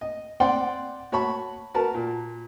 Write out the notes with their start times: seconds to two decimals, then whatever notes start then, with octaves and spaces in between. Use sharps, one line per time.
0.01 D#5
0.40 C4 D5 F#5 G5 C6
1.12 F#4 C#5 A5 B5 C#6
1.74 F#4 A#4 B4 A5
1.95 A#2